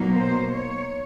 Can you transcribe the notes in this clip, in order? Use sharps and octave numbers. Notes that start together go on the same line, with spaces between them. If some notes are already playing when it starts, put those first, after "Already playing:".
Already playing: B2 F#3 A#3 D#4
C5
C#5